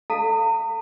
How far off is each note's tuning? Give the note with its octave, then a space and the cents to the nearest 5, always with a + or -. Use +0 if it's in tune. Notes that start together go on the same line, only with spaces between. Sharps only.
A4 +0 F5 +0 A#5 -40